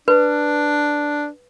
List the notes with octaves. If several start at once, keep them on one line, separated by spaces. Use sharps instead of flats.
D4 B4